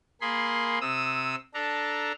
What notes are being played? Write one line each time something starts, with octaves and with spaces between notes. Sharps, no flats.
A#3 G#4 B5 C6
C3 D#6 E6
D4 A4 A#5